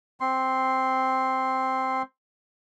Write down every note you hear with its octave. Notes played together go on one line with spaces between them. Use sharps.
C4 C6